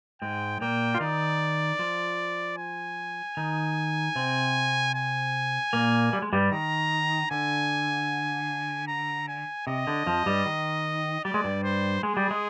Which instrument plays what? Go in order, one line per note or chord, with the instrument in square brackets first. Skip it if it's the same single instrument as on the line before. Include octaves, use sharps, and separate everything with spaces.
[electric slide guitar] G#2 G#3 [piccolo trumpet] G5
[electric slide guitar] A#2 A#3 [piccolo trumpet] G5
[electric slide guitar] F4
[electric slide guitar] D#3 D#4 [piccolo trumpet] D5
[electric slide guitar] F3 F4
[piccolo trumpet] G#5
[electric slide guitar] D#3 D#4
C3 C4
[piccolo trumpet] G#5
[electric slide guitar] A#2 A#3
G3
G#3
G2 G3
[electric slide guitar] D#3 [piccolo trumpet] A#5
[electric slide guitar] D3 [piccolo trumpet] G#5
[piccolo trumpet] A#5
G#5
[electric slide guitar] C3 [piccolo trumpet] D#5
[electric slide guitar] D3
F2 F3
G2 G3
D#3
[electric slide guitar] G3 [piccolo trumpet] D5
[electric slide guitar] G#3
G2 G3
[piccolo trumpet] C5
[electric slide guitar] G#3 [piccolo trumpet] G#4
[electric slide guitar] G3
G#3